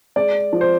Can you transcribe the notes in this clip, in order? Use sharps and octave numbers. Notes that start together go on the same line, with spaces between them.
G#3 D5
F3
C5